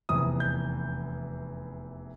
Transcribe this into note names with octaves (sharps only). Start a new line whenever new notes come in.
F1 E2 C3 D#6
G6